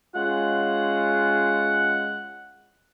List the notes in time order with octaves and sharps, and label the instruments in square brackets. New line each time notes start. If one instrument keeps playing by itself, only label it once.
[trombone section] G#3 C#4 F4 [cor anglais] F#5